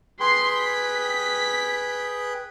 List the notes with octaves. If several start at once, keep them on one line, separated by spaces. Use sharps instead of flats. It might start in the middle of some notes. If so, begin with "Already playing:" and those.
G#4 B4 G5 C6 C7
B6